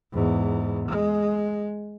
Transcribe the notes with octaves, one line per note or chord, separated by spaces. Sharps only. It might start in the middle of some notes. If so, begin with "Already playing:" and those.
E2 G#2
G#3